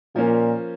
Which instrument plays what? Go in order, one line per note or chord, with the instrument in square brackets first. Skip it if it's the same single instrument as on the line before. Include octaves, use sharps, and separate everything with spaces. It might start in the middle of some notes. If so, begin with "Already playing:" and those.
[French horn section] A#2 [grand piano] F3 A#3 C#4 A#4